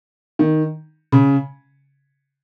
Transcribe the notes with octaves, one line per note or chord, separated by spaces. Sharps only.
D#3
C#3